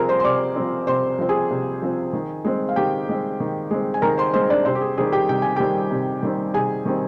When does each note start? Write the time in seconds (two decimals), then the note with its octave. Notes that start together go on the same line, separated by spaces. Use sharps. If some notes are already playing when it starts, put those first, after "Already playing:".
Already playing: C3 F3 C4 G#4 A#4 G#5 A#5
0.09 C5 C6
0.20 C6
0.24 C3 D5 D6
0.56 F3 C4
0.87 C3 C5 C6
1.18 F3 C4
1.29 G#4 G#5
1.51 C3
1.82 F3 C4
2.13 D#3
2.45 G#3 C4
2.69 F5
2.76 D#3 G4 G5
3.08 G#3 C4
3.40 D#3
3.71 G#3 C4
3.94 G#5
4.02 D#3 A#4 A#5
4.18 C5 C6
4.34 G#3 C4 C5 C6
4.50 D4 D5
4.65 C3 C4 C5
4.75 G4
4.81 G#4
4.98 D#3 G3 C4 G#4
5.12 G4 G5
5.29 C3 G5
5.42 G#5
5.56 D#3 G3 C4 G4 G5
5.91 C3
6.23 D#3 G3 C4
6.54 C3 G#4 G#5
6.85 D#3 G3 C4